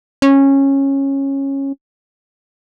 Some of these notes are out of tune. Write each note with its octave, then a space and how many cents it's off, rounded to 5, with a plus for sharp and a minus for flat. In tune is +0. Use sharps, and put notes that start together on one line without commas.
C#4 -15